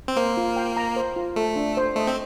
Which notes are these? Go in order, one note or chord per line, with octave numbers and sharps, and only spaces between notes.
C4
A#3 C5
F4
G5
A#5
C5
F4
A3 A4
D4
C5
A3 D#5
C4